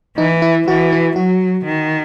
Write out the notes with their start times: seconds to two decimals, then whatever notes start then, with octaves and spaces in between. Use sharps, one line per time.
0.18 E3 D#4
0.42 E4
0.68 E3 F#4
0.92 E4
1.16 F#3 F#4
1.65 D#3